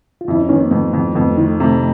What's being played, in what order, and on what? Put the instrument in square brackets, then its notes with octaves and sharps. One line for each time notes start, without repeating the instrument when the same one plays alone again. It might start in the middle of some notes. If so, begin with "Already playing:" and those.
[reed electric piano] F4
[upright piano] F2 [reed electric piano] E4
[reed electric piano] C#4 D#4
[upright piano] D#3 [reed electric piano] B3 C#4
[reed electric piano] A#3 C4
[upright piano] F2 [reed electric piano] A3 B3
[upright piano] F2
[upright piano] F2 [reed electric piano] A3 B3
[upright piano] D#3 [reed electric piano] A3
[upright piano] C3 [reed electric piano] A3